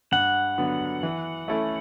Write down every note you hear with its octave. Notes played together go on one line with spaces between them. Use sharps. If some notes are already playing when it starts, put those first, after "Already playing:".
G2 F#5
D3 F#3 B3
E3
A3 C#4 E4 A4